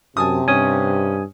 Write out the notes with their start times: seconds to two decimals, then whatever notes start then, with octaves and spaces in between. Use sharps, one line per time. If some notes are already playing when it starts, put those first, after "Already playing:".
0.17 F#2 C3 G#5 A5 D#6
0.48 G2 C#4 G#5 D#6